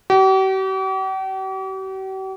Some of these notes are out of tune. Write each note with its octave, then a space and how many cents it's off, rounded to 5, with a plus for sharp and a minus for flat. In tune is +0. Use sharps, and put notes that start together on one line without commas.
G4 -45